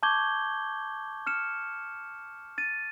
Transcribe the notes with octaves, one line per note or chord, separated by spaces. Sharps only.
A5 C#6 D6 G6 G#6 G7
F6 C#7 E7
A6 D#7